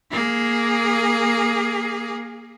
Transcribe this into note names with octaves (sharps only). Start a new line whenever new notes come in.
A#3 G#4